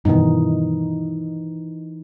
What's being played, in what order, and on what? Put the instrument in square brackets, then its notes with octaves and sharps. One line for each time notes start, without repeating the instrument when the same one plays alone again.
[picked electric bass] G2 B2 D#3 [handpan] E3 D#4